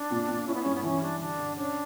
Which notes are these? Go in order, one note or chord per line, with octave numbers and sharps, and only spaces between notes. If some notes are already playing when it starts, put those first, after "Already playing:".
Already playing: D4
A#2
A#2
C#4 E4
B3
G2 C#4
B3
E3 C#4
G3 D4
D3 D4
D3
C#4 D4